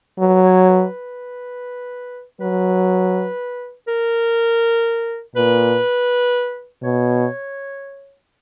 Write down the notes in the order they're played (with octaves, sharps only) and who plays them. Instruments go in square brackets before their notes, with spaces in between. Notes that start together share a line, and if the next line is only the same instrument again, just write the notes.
[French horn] F#3 [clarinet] B4
[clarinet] C#5
B4
[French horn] F#3 [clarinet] B4
[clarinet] A#4
[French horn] A#2 [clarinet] B4
[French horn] B2 [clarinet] C#5